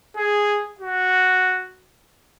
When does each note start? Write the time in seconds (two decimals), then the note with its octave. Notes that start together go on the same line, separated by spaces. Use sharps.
0.17 G#4
0.80 F#4